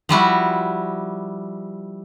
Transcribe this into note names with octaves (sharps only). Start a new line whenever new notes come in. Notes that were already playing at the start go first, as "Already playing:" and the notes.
F3 G3 E4 F#4